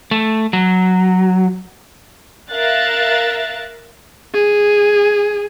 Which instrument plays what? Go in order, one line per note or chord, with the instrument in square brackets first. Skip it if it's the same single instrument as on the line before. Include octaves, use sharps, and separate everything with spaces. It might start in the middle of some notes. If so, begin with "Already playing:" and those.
[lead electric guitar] A3
F#3
[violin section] A#4 E5 F5 F#6 A6
[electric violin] G#4